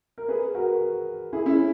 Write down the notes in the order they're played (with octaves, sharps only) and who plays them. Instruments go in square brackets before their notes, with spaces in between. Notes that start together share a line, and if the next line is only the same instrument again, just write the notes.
[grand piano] A#4
G#4 B4
F#4 A#4
E4 G#4
C#4 E4